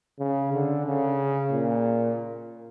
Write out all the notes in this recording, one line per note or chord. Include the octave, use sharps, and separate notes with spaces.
C#3
D3
C#3
A#2